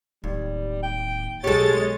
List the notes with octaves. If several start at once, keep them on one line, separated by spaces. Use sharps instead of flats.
D1 D#2 G3
G5
B1 G#3 G4 A4 C#5 A6